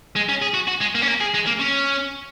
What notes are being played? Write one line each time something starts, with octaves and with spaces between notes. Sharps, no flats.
G#3
C#4
G#4
F#4
F#4
G#3
A#3
C#4
A#3
G#4
G#3
A#3
C#4